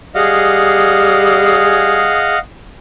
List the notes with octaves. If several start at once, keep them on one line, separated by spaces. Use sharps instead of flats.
G3 G#4 D#5 F5 F#5